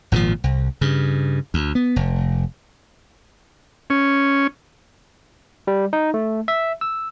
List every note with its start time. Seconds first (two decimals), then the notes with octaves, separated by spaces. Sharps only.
0.12 G#1 A#2 D3 F3
0.44 C2
0.81 G2 C#3
1.54 D2
1.75 B3
1.96 F1
3.90 C#4
5.67 G3
5.93 D#4
6.14 A3
6.48 E5
6.81 E6